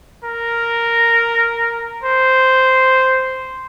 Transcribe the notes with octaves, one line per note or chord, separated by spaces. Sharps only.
A#4
C5